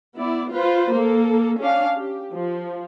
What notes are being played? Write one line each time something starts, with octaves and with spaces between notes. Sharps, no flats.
B3 E4 D5
F4 B4 C5
A#3 A4
C#4 D4 F5
G4
F3